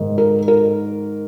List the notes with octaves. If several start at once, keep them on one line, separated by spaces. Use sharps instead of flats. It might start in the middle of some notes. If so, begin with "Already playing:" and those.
Already playing: G#2 D#3
A#4
A#4